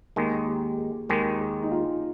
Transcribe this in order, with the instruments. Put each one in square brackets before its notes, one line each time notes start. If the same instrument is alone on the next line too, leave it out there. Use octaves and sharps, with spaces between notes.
[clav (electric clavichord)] D#2 D#3 G#3 [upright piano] A#3
[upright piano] G4
G#4
[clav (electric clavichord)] D#2 D#3 G#3 [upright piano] A#4
[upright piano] G#4
D#4
F4